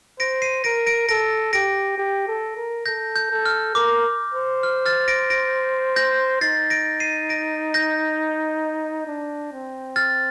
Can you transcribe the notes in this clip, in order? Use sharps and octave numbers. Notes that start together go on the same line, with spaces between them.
C5 A#6 D7
C7 D#7
A#4 A#6 D7
A#6 D7
A4 A#6 D7
G4 A#6 D7
G4
A4
A#4
A4 G6 A#6
G6
A4
F6
A#4 D6
C5
F6
F6 A6
A#6 D7
A#6 D7
G6 A#6
D#4 A6 C7
A#6 D7
C7 D#7
A#6 D7
G6 A#6
D4
C4
F6 A6